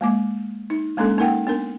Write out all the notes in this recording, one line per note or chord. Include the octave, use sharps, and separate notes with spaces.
G#3 A#3 D6
D#4
G#3 A#3 C#4 D4 A4
A#3 D#4 A#4 F#5 G5
B3 D4 A#4